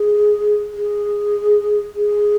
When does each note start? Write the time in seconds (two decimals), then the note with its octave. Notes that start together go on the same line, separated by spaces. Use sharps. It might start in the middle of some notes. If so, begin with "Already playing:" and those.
Already playing: G#4
0.74 G#4
1.95 G#4